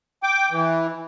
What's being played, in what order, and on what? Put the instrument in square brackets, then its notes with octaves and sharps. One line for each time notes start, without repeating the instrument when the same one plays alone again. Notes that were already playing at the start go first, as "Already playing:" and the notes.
[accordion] G5 D6
E3